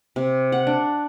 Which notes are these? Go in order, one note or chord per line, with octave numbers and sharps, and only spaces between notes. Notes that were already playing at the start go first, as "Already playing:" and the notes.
C3
F#5
D4